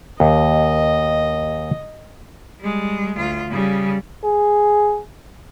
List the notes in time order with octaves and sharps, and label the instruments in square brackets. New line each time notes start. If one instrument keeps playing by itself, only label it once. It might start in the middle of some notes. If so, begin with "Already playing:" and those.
[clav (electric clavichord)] D#2 [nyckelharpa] D#5
[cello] G3 G#3
D2 F4
C#3 G3
[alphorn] G#4